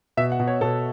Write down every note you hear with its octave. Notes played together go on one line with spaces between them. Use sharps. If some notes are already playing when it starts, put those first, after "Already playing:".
B2 E5
F#5
B2
C#5
B2 A4